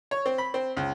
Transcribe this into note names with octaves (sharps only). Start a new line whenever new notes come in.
C#5
C4
B5
C4
C#2